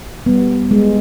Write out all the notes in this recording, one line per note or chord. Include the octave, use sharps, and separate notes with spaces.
G3 B3
G#3